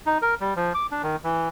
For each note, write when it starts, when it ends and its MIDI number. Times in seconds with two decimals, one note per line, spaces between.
0.06 0.18 63
0.22 0.34 70
0.41 0.54 55
0.56 0.73 53
0.75 0.87 86
0.91 1.02 62
1.03 1.16 51
1.24 1.49 52